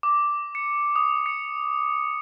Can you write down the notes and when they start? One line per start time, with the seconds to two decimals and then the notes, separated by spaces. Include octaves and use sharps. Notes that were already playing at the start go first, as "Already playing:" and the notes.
0.03 D6
0.55 C#7
0.96 D#6
1.26 C#7